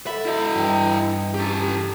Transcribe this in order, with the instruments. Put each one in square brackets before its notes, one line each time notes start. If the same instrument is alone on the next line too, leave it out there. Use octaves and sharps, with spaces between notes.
[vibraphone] A4 F#5 [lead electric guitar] E5 [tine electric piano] B5
[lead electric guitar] E4 D#5
[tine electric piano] G2 E3 [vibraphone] G5
[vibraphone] C#4 [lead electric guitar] G4 A4